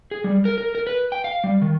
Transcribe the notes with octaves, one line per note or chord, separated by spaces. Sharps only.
G#4
G3
A#4
A#4
A#4
B4
G5
F5
G3
D#3